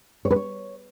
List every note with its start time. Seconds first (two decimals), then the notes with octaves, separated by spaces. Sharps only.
0.25 C#5
0.31 B4
0.36 C#5